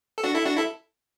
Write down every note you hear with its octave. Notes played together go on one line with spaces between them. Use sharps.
A4
D4 F#4
E4 A4
D4 F#4
E4 A4